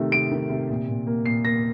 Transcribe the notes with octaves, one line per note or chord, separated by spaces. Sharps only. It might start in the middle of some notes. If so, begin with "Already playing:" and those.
Already playing: C3 D#3 A3
C3 D7
D#3
C3
A#2
A#2
A#3
A#2 C7
A#3 A#6